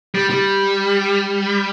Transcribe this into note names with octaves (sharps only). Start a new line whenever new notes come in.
G3
G3